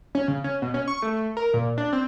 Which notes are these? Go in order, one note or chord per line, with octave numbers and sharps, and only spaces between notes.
C#4
C#3
C#4
B2
C#4
C#6
A3
A#4
A#2
D4
C4